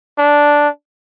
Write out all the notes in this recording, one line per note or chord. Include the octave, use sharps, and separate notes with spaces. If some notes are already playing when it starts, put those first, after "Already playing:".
D4